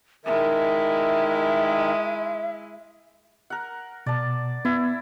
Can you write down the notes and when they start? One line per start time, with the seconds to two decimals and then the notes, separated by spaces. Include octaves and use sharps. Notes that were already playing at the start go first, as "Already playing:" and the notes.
0.25 D#3 G#3 E4 A#4 E5
3.50 A#4 F#5
4.06 B2 D5 A5
4.65 B3 E4